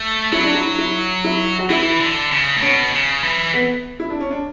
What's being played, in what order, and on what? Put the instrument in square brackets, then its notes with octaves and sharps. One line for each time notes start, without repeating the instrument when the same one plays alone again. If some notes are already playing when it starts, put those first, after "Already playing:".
Already playing: [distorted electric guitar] A3
[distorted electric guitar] F#3 [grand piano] E4
[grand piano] D4
E4
E4
E4
F#4
[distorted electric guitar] E3 [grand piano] E4
[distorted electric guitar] D3
C#3
A2
[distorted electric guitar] B2 [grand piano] C#4
[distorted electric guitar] C#3
E3
[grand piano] B3
E4
D4
C#4
D4